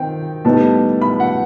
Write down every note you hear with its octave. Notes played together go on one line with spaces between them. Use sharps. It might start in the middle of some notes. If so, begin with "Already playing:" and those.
Already playing: D#3 C4 D#4 G5
A2 G3 B3 D#4 A5
B5
F#5